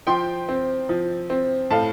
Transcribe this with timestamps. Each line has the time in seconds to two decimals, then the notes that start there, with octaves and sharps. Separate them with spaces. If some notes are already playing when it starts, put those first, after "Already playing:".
0.07 F3 G5 C6
0.49 C4
0.89 F3
1.30 C4
1.70 A2 F5 A5